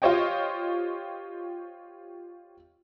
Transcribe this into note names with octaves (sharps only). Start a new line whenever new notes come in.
F4 G4 C5 C#5 D#5 G5